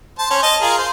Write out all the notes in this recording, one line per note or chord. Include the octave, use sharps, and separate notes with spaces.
C5 A5
C#4 C5
D#5 A5
F4 G#4 A#4
C5